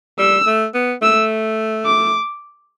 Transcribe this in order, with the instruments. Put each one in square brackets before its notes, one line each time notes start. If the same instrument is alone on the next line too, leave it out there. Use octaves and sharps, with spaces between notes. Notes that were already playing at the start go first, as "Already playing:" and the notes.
[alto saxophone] G3 [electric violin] E6
[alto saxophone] A3
B3
[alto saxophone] A3 [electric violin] E6
[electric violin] D6